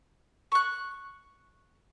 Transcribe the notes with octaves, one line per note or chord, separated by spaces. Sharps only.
C#6 F#6